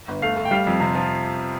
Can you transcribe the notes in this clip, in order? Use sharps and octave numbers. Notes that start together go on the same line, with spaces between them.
G1
A3 F5
A3
G5
G3 F5
F2
C3
F3